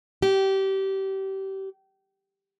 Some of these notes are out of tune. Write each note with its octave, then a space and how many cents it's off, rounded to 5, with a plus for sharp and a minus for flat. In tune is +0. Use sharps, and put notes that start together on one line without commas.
G4 -25